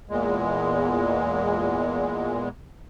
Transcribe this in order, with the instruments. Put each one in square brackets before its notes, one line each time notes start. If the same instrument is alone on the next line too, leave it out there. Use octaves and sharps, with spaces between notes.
[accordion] E2 A#2 G#3